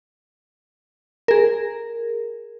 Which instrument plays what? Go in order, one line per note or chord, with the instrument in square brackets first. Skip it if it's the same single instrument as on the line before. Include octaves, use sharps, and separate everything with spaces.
[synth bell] G#4 A#4